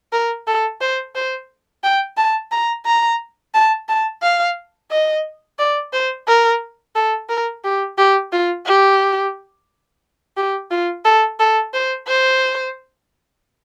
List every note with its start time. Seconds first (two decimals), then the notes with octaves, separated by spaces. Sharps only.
0.13 A#4
0.47 A4
0.81 C5
1.15 C5
1.84 G5
2.18 A5
2.52 A#5
2.86 A#5
3.54 A5
3.89 A5
4.23 F5
4.91 D#5
5.59 D5
5.93 C5
6.27 A#4
6.96 A4
7.30 A#4
7.64 G4
7.98 G4
8.33 F4
8.66 G4
10.37 G4
10.71 F4
11.05 A4
11.40 A4
11.74 C5
12.08 C5